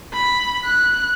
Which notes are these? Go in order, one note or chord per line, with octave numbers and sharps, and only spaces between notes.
B5
F#6